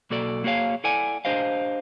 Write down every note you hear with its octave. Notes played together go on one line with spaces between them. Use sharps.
B1 A#3 F#4 A4 D5
A#3 F#4 G#4 C#5 F5
E4 A4 D5 F#5 G#5
D4 G4 C5 D#5 F5